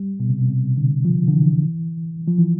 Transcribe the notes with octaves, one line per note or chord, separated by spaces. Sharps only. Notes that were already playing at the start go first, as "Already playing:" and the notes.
Already playing: G3
B2
C3
B2
C3
D3
F3
D3
E3
F3
E3